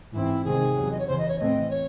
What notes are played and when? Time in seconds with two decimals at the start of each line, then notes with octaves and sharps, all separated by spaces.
0.13 G#2 E3 C4 E4
0.44 C3 D#3 G#3 C4 G#4
0.76 E2 C3 F#3
0.91 D#5
0.99 C#5
1.08 E2 C#3 E3 C5
1.18 D#5
1.28 C#5
1.39 A2 E3 A3 C4 D#5
1.70 C#5